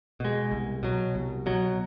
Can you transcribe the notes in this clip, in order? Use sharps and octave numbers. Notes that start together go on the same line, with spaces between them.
B2 G#3
C2
B2 F#3
C2
B2 F#3